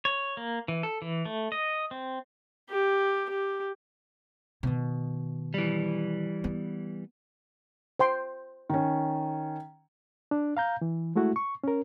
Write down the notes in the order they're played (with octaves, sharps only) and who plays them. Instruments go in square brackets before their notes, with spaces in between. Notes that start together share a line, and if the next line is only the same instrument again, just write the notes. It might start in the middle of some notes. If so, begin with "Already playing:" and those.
[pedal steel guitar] C#5
A#3
E3
A4
E3
A3
D#5
C4
[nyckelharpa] G4
G4
[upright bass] B2 D#3
[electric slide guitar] E3 G3
[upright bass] B3
[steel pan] C5 G5 C6
[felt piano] D#3 C#4
[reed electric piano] D4
F5 A#5 G6
E3
G#3 A3 E4 F#4
C#6
C#4 A#4